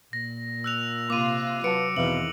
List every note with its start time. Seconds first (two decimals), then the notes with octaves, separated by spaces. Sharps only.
0.13 A#2 A#6
0.64 E6 F#6 F7
1.10 C3 A#3 F4 D6 D#7
1.64 F#3 B4 F#5 A5 C#7 D7
1.97 E2 B2 D#3 C4 E5 F5 F#7